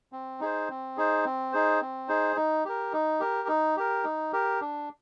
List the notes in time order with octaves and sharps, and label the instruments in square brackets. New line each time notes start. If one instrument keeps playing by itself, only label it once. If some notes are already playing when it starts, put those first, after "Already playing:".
[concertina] C4
D#4 G#4 C5
C4
D#4 G#4 C5
C4
D#4 G#4 C5
C4
D#4 G#4 C5
D#4
G4 A#4
D#4
G4 A#4
D#4
G4 A#4
D#4
G4 A#4
D4